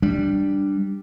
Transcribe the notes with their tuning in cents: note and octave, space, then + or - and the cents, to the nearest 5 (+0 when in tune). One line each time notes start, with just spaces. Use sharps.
G3 +0 D4 +0